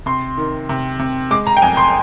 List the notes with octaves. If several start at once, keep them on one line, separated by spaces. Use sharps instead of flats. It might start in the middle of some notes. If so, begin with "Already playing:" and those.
C3 C6
D#3
C3
C3
G#3 D6
A#5
G5
F2 G#5
C6